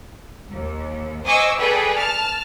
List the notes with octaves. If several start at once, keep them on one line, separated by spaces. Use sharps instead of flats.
D#2
C5 D#5 G#5 C#6 D6 E6
G#4 A4 B4 D5 G5
A5 F6